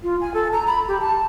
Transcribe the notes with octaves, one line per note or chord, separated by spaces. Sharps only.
F4
G#5
A4
A#5
B5
G4
A5